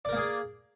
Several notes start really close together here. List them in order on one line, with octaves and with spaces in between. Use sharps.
D5 A#4 A#3 G#4